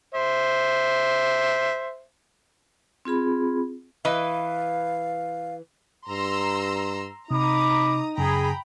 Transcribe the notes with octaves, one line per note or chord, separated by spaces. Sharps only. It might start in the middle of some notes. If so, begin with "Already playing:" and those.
C5 E5
C4 F4 G#4 B5
E3 B4 D#5 F5
G2 A#5 C6 E6
C3 D#4 A#5 B5 D6 D#6
F#2 C#3 G#4 G5 A#5 B5